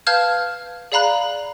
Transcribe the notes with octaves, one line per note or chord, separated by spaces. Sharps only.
B4 F5 A5 F6 G6 G#6
G#4 D5 F5 A#5 B5 F#6